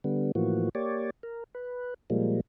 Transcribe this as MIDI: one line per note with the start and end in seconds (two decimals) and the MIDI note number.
0.04 0.32 50
0.04 0.32 55
0.04 0.32 59
0.35 0.69 45
0.35 0.69 52
0.35 0.69 53
0.35 0.69 58
0.35 0.69 66
0.75 1.10 58
0.75 1.10 67
0.75 1.10 73
0.75 1.10 74
1.23 1.44 70
1.55 1.94 71
2.10 2.40 46
2.10 2.40 53
2.10 2.40 55
2.10 2.40 56
2.10 2.40 58